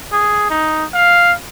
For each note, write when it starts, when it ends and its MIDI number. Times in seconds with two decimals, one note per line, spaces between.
0.12 0.50 68
0.50 0.84 63
0.94 1.32 77